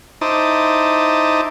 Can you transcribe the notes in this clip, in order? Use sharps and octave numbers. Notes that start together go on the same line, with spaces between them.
D#4 E4 C5 A5 D6 D#6